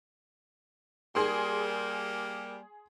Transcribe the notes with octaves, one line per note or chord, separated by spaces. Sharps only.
G3 A#3 G#4 C6